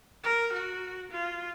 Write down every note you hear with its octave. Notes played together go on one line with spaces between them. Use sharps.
A#4
F#4
F4